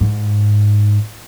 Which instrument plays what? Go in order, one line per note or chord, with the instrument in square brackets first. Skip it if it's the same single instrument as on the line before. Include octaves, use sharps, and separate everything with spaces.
[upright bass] G#2